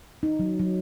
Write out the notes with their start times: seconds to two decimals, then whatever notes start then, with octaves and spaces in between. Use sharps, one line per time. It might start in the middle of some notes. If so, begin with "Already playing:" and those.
0.23 D#4
0.39 F#3
0.60 F#3